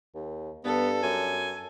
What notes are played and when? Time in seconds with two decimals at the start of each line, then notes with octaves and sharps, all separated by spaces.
0.15 D#2
0.65 G2 B3 A4
1.03 F#2 G#5